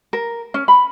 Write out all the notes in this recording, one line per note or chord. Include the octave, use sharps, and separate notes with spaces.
A#4
C#4
B5